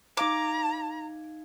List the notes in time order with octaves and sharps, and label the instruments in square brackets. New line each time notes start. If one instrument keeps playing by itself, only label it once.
[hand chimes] D#4 F5 G#6 [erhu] A#5 [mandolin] D6